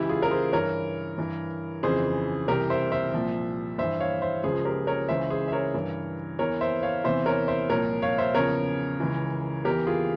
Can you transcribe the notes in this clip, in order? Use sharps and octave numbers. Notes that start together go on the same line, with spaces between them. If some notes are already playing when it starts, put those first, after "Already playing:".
Already playing: C#2 C#3 E3 E4 G4
F4 G#4
A#4
G#4 C5
G2 E3 A#4 C#5
G2 E3
F2 C#3 E3 G#4 C5
C2 C3 E3 G4 A#4
C5 E5
C5 E5
C2 A#2 F3
G2 E3 C5 E5
C#5 F5
C5 E5
C#2 C#3 F3 G#4 C5
G4 A#4
A#4 C#5
C#2 C#3 E3 C5 E5
G#4 C5
E5
A#4 C#5
G2 E3
E2 E3 A#4 C#5
C5 E5
C#5 F5
E2 C3 E3 C5 E5
A#4 C#5
C5 E5
C2 A#2 F3 A#4 C#5
C#5 F5
C5 E5
E2 C#3 F3 A#4 C#5
C#2 C#3 E3
E2 E3 G4 A#4
F4 G#4